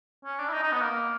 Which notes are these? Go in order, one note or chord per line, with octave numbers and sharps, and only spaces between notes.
C#4
D4
E4
D#4
D#4
B3
A#3